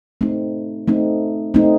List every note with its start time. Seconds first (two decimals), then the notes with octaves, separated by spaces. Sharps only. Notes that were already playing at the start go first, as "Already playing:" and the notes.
0.21 A3 C4 D#4
0.87 A3 C4 D#4
1.54 A3 C4 D#4